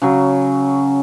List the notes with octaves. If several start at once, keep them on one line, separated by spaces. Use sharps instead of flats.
C#3 F#3 C#4